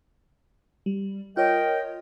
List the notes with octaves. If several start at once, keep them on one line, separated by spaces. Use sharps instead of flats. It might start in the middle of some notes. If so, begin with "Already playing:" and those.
G3
F4 A#4 C#5 D#5 G5